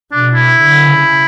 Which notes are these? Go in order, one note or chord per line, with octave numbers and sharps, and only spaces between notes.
B2 D4
E4
D3
C#3